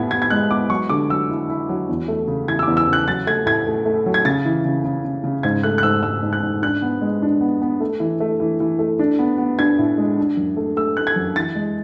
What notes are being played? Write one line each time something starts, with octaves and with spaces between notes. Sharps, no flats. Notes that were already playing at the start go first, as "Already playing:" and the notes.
Already playing: A2 B3 G#6
B3 G#6
G#6
G#3 F#6
B3 D6
F#3 C#6
D3 D6
F#3 E6
E4
E4
F#3
E2
A3
C#3
E3 G#6
E6
E2 D6
E6
C#3
F#6
F#3 A6
A3 G#6
A2 G#6
A3
A3
F#3
G#6
C#3 A6
E3
C#3
C#3
C#3
C#3
G#2 G#6
A3 F#6
F#6
G#2 E6
G#2 E6
G#2
F#6
G#2
D4 F#6
B3
G#3
D4
B3
B3
A3
E3
A3
E3
E3
A3
D4
B3
B3
D4 G#6
A2
G#3
D4
F#2
A3
A3 E6
A3 F#6
G#6
F#2
E3 A6
G#3